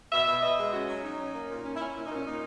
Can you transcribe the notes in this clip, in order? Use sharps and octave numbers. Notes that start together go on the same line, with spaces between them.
B2 E5
B2
B2 D#5
G#3
C#4 F#4
F#3
F#3 D#4
C#4
A#3
A#2
C#4
E4
C#4
A#2 E4
D#4
A#2
C#4
A#2 D#4